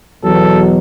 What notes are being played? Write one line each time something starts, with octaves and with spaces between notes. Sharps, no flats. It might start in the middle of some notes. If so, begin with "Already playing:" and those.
E2 B2 F#3 A4